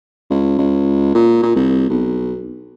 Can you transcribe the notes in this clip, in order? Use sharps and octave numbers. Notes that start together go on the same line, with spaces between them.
C#2
C#2
A#2
A#2
C2
B1